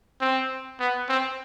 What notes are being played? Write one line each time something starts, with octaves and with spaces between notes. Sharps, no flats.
C4
B3
C4